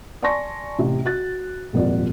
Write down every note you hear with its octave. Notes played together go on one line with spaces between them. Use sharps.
D5 G#5 A5 C6 C#6 A#6
A1 C3
F#4 F#6 A6
D#1 G#1 F2 D5